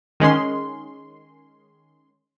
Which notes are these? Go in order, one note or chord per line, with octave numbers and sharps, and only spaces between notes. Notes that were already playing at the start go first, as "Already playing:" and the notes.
D#3 G#3 C#4 C6